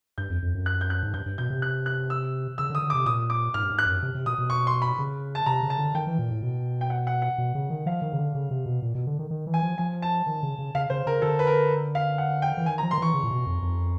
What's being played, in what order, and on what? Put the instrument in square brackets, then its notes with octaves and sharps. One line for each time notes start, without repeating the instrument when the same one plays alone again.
[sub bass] G2 [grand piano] G6
[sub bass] F2
F2
F#2
[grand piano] F#6
G6
F#6
[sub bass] G#2
[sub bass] G2 [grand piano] G6
[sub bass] G2
[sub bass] B2 [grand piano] G6
[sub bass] C3
[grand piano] F#6
F#6
E6
[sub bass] C#3 [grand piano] E6
[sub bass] D3
[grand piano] D#6
[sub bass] D3
[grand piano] D6
[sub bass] C3
[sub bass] A#2 [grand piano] D#6
[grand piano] D6
[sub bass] G#2 [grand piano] F6
[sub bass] G2
G#2
[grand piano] F#6
[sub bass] F#2
C3
C3
[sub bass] B2 [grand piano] D#6
[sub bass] B2
[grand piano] C#6
C6
B5
[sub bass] C#3
[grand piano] A5
[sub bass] C3 [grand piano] A#5
[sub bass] C#3
[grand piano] A5
[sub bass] D3
[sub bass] D#3 [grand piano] G5
[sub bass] E3
A#2
A2
B2
[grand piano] G5
F#5
F#5
F#5
[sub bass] B2
C#3
D#3
[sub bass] F3 [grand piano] F5
[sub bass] D#3
C#3
D3
C#3
C3
B2
A#2
B2
D3
D#3
D#3
E3
[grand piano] G#5
[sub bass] F3
[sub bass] F3 [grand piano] G#5
[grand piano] A5
[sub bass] D#3
C#3
C#3
[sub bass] C#3 [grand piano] F5
[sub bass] C#3 [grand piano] C5
[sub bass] C#3 [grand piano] A#4
[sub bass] D3 [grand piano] A4
[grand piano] B4
A#4
F5
F#5
G5
[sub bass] E3
[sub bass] D#3 [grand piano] G#5
[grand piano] A#5
[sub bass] F3
[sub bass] D#3 [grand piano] C6
[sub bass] E3 [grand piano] C#6
[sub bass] C#3
A#2
B2
F2
F2